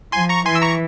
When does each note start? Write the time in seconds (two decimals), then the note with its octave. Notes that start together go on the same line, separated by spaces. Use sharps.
0.12 F3 G#5 C6
0.29 A#5 C#6
0.46 E3 G#5 C6
0.55 E6
0.62 A#5 C#6